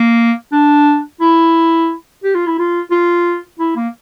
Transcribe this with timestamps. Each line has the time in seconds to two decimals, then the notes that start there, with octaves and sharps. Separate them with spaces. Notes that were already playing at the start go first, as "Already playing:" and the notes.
Already playing: A#3
0.52 D4
1.21 E4
2.24 G4
2.35 F4
2.47 E4
2.59 F4
2.91 F4
3.59 E4
3.76 A#3